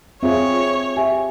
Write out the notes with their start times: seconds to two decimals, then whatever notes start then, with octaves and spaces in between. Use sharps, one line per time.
0.23 C4 F4 G#4 C#5 E5
0.97 G4 E5 G#5